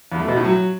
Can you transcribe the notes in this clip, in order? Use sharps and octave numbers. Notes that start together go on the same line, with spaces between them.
E2
A3
B2
A2
F#3